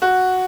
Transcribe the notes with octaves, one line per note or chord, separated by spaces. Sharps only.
F#4